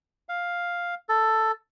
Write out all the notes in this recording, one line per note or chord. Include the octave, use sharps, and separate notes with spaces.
F5
A4